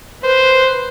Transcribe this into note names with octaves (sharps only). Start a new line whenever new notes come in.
B4 C5